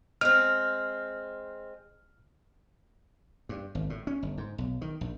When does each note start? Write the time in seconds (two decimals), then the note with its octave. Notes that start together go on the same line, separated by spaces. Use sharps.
0.21 G#3 C4 F6
3.49 G2
3.75 G#1
3.90 A2
4.07 C#4
4.23 G1
4.38 G#2
4.58 B1
4.81 D#3
5.01 A#1